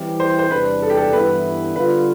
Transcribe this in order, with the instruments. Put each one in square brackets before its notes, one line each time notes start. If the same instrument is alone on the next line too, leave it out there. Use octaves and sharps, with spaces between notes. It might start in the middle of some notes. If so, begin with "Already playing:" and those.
Already playing: [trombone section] E3 G3 C4 E4 G4
[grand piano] C5
C5
[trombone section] E2 C3 G3 D4 [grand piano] B4
[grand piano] A4
G4
A4
[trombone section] G2 E3 G3 B3 E4 [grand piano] B4
[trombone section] D3 G3 B3 F4 [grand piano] B4